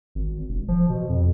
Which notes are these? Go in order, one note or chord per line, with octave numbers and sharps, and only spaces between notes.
G#1
E1
F3
B2
F2